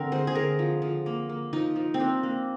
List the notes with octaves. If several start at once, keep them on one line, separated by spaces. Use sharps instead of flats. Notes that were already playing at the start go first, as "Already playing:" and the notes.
Already playing: D3 C4 A#4
G#3 C5
G#4
D3 A#4
F3
F3
A#3
A#3
F3 D#4
F3
C4
A#3 D4
A#3